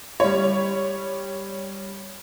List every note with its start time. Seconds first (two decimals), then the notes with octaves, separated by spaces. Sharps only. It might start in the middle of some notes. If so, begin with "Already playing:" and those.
0.20 G3 C#5